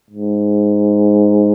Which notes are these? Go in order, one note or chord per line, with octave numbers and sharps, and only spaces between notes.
G#2